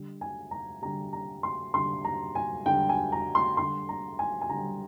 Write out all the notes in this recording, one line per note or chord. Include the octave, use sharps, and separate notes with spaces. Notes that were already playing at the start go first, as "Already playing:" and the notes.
Already playing: D3 G3
G#5
A#5
D3 G3 A#5
A#5
C6
D3 G3 C6
A#5
G#5
D3 G3 G5
G#5
A#5
C6
D3 G3 C6
A#5
G#5
G#5
D3 G3 A#5